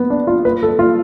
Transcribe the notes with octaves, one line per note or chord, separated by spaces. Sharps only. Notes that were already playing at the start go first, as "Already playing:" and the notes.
Already playing: B3
D4
F4
B4
A4
F4